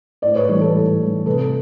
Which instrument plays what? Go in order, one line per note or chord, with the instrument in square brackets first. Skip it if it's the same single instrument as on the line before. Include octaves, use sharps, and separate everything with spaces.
[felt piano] A2 C5 D5
B4 C#5
E3 G3 B4 C#5
A4 B4
A2
E3 G3
C3 A4 B4